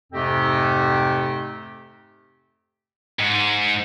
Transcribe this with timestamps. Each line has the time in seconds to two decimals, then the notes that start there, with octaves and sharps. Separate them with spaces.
0.12 F2 G#2 C3 A3 C4 G4
3.20 G#2